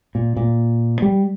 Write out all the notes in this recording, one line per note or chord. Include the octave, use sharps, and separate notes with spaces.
A#2
A#2
G3